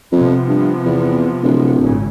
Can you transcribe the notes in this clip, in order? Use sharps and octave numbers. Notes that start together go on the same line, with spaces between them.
F2 C3 F3 B3
G2
E2
D1
G#1 A#2 C#3